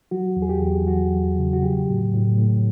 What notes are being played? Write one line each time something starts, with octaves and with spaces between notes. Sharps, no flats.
F#3 F#4
E2
G#4
G4
E2
F#3 F#4
E2
C#3
F#4
F#3 G4
A2
A2
A2